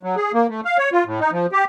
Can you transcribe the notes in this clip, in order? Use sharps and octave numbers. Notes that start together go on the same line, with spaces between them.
F#3
G#4
A#3
A3
F5
C#5
F4
A2
D#4
F3
G4